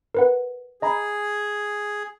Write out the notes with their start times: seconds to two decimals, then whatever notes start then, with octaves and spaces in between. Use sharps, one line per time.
0.15 A#4 B4 F#5
0.82 G#4 D#5 A#5 B5